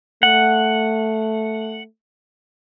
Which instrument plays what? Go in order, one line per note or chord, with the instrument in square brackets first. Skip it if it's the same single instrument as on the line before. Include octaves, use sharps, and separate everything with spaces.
[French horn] A3 [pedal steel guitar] F#5